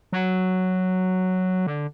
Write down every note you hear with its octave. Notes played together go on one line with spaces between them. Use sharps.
F#3
D3